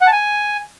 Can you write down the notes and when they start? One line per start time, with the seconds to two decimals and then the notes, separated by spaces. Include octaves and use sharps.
0.01 F#5
0.07 A5
0.12 G#5